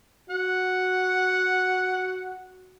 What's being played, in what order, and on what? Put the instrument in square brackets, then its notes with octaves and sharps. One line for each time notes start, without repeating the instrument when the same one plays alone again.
[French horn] F#4 [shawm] F#5